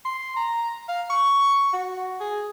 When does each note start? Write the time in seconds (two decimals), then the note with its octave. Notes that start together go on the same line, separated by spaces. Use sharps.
0.05 C6
0.36 A#5
0.89 F5
1.10 C#6
1.73 F#4
2.20 G#4